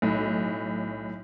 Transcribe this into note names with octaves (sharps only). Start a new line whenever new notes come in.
B1 A2